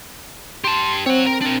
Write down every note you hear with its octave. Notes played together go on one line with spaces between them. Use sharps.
G4 A5 C6
C4 C#5 F#5
A#4
D4 A#4